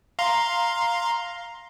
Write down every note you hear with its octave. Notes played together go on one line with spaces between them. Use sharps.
F5 A#5 C6